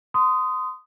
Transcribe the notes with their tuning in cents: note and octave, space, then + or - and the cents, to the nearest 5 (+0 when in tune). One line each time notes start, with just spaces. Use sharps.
C6 -25 D#6 +0